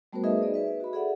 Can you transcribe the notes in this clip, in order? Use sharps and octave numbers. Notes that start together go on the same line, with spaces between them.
G3 A3 B3 F#4 A#4 C5
D#4 G#4 A#4 B4 D#5 E5
G#4 D5 D#5
B4 E5
F#4 B5
G#4 A4 D5 E5 F#5